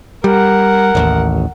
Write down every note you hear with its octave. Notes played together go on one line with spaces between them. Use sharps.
G3 A#4 F#5
D#1 A1 D#2